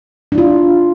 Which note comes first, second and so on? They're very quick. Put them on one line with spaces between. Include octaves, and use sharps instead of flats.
D4 E4 F4